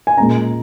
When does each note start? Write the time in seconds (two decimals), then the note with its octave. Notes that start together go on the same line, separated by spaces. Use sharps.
0.07 G#5
0.17 A#2 G#3 C#4 A#5